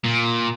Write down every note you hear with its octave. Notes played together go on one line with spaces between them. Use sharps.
A#2